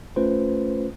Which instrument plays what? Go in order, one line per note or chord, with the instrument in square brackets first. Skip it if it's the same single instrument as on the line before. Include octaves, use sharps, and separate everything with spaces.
[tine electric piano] A3 C#4 F4 B4 C5